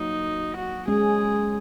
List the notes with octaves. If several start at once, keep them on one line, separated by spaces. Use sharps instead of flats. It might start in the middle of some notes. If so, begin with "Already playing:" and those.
Already playing: F#3 A#3 D#4
F#4
G#3 C#4 G#4